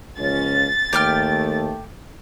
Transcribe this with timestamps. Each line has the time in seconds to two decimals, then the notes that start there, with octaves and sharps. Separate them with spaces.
0.18 C#2 F3 A#3 C#4 A6
0.93 D#2 A3 G4 G5 F6